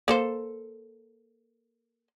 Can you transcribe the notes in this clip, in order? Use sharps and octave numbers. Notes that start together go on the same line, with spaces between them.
A#3 A4 C5